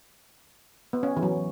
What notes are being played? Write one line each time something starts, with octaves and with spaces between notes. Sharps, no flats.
B3
C#4
E3
F#3